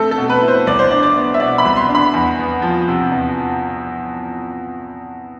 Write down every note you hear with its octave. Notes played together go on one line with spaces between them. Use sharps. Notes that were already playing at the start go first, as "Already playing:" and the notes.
Already playing: A3 C4 A4
A4
B2
B4
E4
C5
C2 D5
C5
D4 D5
D5
B3
E5
B2 D5
B5
C2
C6
D4
B5
E2
B3
F3
C3
E2